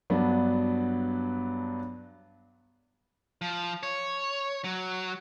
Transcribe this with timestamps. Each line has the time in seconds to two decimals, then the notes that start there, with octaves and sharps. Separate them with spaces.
0.10 G2 F#3 B3 D4
3.41 F3
3.83 C#5
4.64 F#3